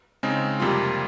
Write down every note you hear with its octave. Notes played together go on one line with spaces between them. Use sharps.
C#3 G#3 C4 D#4
F2 C3 G3 A#3 F4